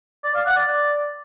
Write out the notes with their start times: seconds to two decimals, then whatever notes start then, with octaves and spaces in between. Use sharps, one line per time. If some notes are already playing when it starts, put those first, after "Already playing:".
0.24 D5
0.35 F5
0.46 F#5
0.56 D5